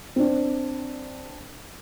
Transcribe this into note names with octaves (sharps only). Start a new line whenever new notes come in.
C4 D4